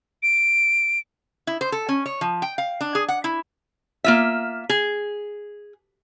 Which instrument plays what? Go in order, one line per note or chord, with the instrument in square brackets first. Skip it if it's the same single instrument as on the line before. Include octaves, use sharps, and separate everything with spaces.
[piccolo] D7
[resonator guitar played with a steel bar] E4
C5
A4
C#4
C#5
F3
G5
F5
D4
G#4
F#5
E4
A#3 F4 E5
G#4